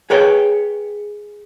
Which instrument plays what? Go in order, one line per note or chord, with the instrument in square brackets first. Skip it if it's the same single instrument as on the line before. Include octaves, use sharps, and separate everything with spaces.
[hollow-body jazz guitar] G#4 B4 C#5 G5